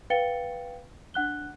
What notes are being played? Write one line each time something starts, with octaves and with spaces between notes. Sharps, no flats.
B4 F5 G5 A6 C#7 G7
D4 F#5 F#6 G7